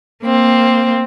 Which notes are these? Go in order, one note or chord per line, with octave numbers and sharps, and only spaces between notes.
A#3 C4